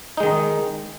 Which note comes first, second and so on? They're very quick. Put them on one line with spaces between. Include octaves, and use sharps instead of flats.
D#4 G#3 D#3